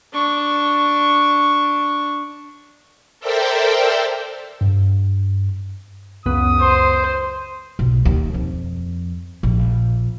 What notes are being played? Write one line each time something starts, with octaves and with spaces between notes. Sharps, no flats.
D4 C#6
A4 A#4 C5 D5 E5 G5
G2
C#2 F#2 B3 D#6
C5 C6
B1
D#2
F2
A#1